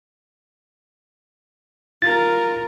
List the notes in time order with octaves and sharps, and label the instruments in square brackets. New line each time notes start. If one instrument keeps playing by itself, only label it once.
[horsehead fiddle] F4 A#4 [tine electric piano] A6